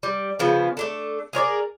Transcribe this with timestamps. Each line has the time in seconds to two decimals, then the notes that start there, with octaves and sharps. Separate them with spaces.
0.03 G3
0.39 C#3 F3 B3
0.77 A3 D4 A4
1.33 G#4 A#4 C#5 D5